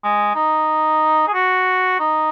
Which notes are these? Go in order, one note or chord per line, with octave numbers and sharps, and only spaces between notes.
G#3
D#4
G#4
F#4
D#4